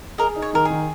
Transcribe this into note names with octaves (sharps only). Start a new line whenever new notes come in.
G#4 A#4 D#5
D#4
C#5
D#3 A#4
G#4
D#3